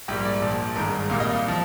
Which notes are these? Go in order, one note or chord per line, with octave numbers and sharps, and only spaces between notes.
A#1 G#2 G3 A#3 G4
D5
A#1 A#2 F3
G#1 G2 D#3 G#3 A#4
C2 A#2 G3 A#3 F5
D#5
F5
F3